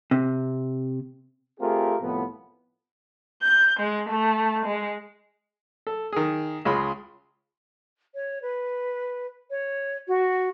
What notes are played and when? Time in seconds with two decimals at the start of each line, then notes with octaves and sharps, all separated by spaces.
0.11 C3
1.60 A3 C4 F4 G4 G#4 A#4
2.01 C2 A2 C3 F3 B3
3.42 G6
3.80 G#3
4.10 A3
4.66 G#3
5.87 A4
6.13 D#3 G#4
6.65 C#2 G#3 F4 C#5 B5 C6
8.14 C#5
8.42 B4
9.50 C#5
10.07 F#4